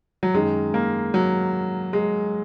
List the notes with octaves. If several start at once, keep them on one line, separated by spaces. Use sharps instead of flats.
F#3
F#2 D#3 G#3
A#3
F#3
G#3